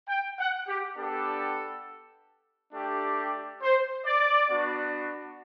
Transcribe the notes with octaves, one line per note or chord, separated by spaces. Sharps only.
G5
F#5
G4
B3 D4 G4 A4
A3 D4 G4
C5
D5
B3 D4 F#4